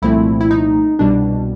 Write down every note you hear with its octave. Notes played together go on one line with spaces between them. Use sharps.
C2 A#2 F3 A3 C4 E4
E4
D#4
C2 B2 G3 D4